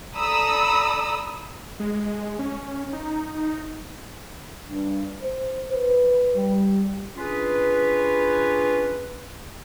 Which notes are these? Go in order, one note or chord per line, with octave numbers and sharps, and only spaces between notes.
A4 D5 A#5 B5 D#6 E6
G#3
C#4
D#4
G2
C5
B4
G3
C#4 D4 F4 G#4 B4